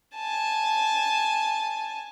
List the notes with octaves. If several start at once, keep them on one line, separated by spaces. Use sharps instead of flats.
G#5 A5